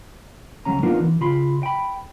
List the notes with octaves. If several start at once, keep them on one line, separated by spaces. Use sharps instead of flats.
C#2 F#3 G#3 C#4 A#5
A#3 B3 D4 D#4 F4 A#4
E3
C#3 F4 B5 C6
G5 B5